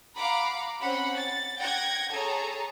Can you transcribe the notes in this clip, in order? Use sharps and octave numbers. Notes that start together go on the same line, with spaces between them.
F5 F#5 A#5 B5 D6
C4 C#4 F#5 B5
A6
F#5 G5 G#6 A#6
G#4 A4 C#5 A5 A#5